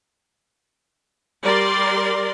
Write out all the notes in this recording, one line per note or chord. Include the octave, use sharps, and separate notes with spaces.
G3 A#4 D5 C6